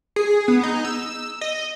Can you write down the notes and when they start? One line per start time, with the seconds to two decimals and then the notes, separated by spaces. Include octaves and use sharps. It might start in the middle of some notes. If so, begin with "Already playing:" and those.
0.16 G#4
0.48 B3
0.63 D#4
0.85 E6
1.41 D#5